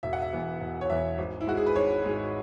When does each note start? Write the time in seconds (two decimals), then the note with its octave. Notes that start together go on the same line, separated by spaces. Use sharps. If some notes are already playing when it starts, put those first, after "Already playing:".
0.03 E1 E5
0.13 F#5
0.22 E5
0.33 E2 E3 B3
0.60 E1
0.81 C#5
0.90 E2 E3 B3 E5
1.18 G#1
1.41 E4
1.47 G#2 G#3 F#4
1.57 G#4
1.66 B4
1.75 G#1 C#5
2.04 G#2 G#3